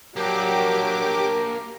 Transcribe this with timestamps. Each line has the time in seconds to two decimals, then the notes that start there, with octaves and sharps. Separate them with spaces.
0.16 F#3 A#3 D4 G4 A#4 D6